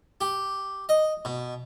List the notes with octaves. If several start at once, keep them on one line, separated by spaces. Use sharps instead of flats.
G4
D#5
B2